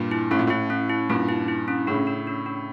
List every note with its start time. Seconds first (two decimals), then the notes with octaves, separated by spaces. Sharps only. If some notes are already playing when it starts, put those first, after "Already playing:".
Already playing: G2 A#2
0.11 E4
0.31 A2 C#4
0.39 A#2
0.47 A2 E4
0.70 C#4
0.90 E4
1.10 G2 A#2 C#4
1.29 E4
1.48 E4
1.68 C#4
1.87 A2 C#3 D4
2.07 D4
2.27 D4
2.46 D4